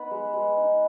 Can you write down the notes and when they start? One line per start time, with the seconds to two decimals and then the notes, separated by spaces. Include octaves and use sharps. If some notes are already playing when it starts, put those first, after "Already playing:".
Already playing: B3 D#4 B4
0.11 G#3
0.34 G#3
0.57 D#4